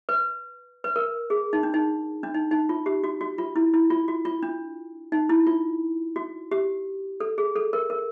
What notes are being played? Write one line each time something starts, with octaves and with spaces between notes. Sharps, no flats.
B4
B4
A#4
G#4
D#4
D4
D#4
D4
D#4
D#4
F4
G4
F#4
F#4
F4
E4
E4
F4
F#4
F4
D4
D#4
E4
F4
F#4
G4
A4
G#4
A4
A#4
A#4